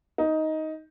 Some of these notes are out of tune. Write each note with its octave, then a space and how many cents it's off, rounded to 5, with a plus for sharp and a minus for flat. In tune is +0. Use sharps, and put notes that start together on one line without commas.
D#4 +10